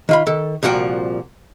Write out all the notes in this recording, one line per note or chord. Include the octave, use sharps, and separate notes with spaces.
D#3 F4 B5
D#3 A4
C2 A#2 F3 F#4 G5